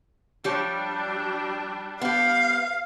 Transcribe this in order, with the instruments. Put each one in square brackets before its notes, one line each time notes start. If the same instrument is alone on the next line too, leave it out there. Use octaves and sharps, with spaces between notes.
[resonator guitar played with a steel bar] F3 G4 C#5 [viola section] G3 D4
[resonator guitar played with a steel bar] B3 G4 [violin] F5